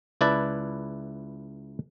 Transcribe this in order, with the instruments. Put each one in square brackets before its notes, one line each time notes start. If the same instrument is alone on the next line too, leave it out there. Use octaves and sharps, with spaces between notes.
[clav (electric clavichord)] C#2 E4 B4 D5 A5